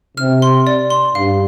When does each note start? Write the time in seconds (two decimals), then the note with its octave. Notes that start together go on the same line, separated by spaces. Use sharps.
0.17 C3 F6
0.42 C6
0.67 D5
0.90 C6
1.15 G2 F5